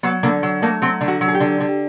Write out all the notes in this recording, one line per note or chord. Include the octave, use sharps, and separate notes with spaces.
F#3 B3
D3 A#3
F#3
A3 A#3
F#3 C4
D3
F#4
F#3
G#4
G4
D3
D3